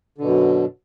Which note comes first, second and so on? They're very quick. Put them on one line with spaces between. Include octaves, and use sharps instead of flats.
D3 B2 F#2